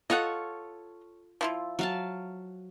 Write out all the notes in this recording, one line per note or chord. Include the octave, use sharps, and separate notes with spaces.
F4 A4 C#5 D#5 F5 F#5
F3 E4 F4
F#3 F5 A5